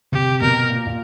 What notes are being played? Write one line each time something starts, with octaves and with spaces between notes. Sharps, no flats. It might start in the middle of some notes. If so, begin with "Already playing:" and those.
C3 G4
B2 A#4
A#2
A#2